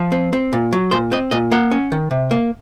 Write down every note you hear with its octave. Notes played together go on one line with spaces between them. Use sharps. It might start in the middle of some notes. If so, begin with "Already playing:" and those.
Already playing: F3
C4
C4
A#2
F#3
A#2 C5
C4 D#5
A#2 D#5
A#3 F#5
C#4
D#3
C3
A#3